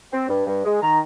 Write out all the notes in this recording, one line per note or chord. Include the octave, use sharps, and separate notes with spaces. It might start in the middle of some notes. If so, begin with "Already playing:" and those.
C4
G2
G2
G#3
D#3 A#5